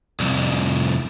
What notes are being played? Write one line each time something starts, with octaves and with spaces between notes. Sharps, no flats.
C2 F2